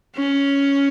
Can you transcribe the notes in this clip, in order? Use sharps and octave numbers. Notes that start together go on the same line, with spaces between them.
C#4